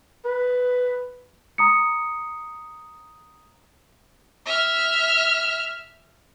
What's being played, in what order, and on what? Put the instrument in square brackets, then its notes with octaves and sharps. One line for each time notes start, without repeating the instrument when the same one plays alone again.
[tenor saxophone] B4
[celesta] A#5 D#6 C#7
[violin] E5 F6